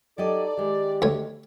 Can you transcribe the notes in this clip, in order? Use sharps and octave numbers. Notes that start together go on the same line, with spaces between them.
F#3 D#4 G4 A4 D5 D#5
D#3 G#3 G4
D2 C#5